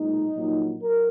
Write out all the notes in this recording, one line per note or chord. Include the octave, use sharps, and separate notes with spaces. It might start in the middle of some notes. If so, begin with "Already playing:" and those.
Already playing: B1 A#2 G#3 D#4
A#1 A#2 F#3
F#3 A#4